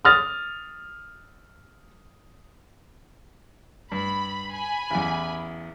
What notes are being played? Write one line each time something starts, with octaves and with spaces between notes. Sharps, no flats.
D#6 F6 A6
G2 B5
G#5 B5
A1 E2